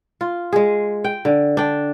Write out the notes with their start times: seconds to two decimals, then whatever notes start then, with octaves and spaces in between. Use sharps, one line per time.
0.21 F4
0.53 G#3 G#4
1.04 G5
1.25 D3
1.57 D4 G5